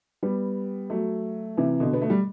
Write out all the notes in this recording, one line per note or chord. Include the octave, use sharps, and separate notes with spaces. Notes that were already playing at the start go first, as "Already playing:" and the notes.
G3 B3
F#3 A3
C3 E3
B2 D3
B3
A3
G3